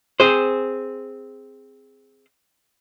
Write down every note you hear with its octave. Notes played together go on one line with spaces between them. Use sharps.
C4 G#4 C5